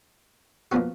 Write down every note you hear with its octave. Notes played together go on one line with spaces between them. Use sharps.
A#2 F3 B3 F#4